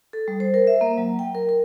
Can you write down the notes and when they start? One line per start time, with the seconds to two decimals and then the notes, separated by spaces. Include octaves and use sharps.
0.13 A4
0.28 G3
0.40 C5
0.54 A#4
0.67 E5
0.81 A#3
0.98 F#3
1.19 G5
1.35 A#4
1.49 A#4